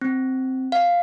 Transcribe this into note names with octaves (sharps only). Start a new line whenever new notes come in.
C4
F5